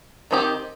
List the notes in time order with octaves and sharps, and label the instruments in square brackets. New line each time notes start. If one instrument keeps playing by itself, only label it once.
[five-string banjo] D#3 C4 D#4 G4